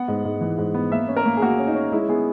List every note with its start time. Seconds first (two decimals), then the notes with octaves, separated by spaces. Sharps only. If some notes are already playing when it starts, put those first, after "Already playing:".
Already playing: B3 F#5
0.08 G#2
0.25 G#2
0.41 E3
0.58 G#2
0.74 B3
0.92 A#3 E5
1.08 C#4
1.17 A#4
1.26 A#3
1.37 G#4
1.42 A#3 F#4
1.59 C#4
1.67 D#4
1.75 C#4
1.92 G#3 E4
2.09 B3 G#4